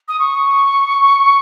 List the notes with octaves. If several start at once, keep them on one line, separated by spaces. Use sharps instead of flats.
D#6
C#6